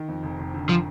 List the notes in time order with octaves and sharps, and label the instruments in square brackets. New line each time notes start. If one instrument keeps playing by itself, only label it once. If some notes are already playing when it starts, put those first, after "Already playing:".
Already playing: [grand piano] D#3
F2
F1
F1
D3
[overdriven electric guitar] F3